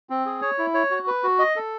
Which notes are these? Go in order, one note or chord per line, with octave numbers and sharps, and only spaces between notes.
C4
G#4
C#5
E4
C#5
F#4
B4
F#4
D#5
A4